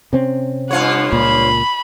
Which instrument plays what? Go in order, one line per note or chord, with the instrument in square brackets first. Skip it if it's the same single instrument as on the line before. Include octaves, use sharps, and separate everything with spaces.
[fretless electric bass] C3 C4 C#4
[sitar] G2 F4 C#5 [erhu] F#5
[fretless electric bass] C#2 A#2 [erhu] B5